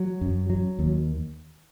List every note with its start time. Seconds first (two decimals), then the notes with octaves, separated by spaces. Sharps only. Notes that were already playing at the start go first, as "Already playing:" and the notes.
Already playing: F#3
0.21 F#2
0.50 F#3
0.79 D#2